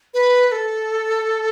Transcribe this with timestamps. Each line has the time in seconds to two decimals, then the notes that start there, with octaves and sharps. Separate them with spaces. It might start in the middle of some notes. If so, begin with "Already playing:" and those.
0.14 B4
0.48 B4
0.52 A4